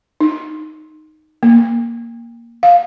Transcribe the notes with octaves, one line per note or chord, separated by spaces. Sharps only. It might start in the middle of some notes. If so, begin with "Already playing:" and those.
D#4
A#3
F5